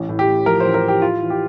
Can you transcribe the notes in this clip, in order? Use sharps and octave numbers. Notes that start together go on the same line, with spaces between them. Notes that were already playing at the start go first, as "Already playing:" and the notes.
Already playing: A1
A2
G4
A1
F3 A#4
C5
A1
A#4
A2 G4
F4
E3
G4